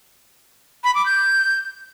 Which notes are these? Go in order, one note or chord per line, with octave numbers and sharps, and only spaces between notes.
B5
D6
G6